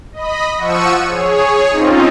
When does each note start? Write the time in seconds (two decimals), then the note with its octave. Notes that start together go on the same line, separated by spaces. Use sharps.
0.13 D#5 B5
0.57 F3 F#5 C#6 E6 C#7 D#7
1.08 G#4 C#5
1.71 C4 C#4 D#4 F4